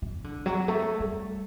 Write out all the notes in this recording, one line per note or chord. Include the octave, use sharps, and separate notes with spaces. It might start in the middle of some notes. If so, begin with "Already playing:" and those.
E3
D3
F#3
A3
G3